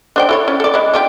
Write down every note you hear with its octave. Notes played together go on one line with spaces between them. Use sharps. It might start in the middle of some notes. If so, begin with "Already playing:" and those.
D4 C5 G5
E4 A4 C#5
C#4
A4 D5
G#3 E4
D4 F4 G4